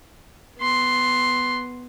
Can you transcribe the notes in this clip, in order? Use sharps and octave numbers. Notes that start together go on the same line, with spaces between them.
B3 C6